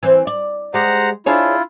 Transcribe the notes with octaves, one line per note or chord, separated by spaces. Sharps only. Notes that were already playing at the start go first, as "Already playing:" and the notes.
E3 C4
D5
G#3 G4 C5 F#5 A#5
D4 E4 F4 G#4 C#5